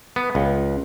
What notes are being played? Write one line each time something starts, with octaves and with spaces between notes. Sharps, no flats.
B3
C#2